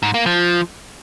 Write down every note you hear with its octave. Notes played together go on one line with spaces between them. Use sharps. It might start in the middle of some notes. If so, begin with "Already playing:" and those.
G#2
A#3
F3